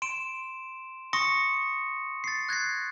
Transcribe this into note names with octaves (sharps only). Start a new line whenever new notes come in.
C6 D7 E7
C6 C#6 D#6 A#6 C#7
A6 C7
F#6 G#6 A#6 C7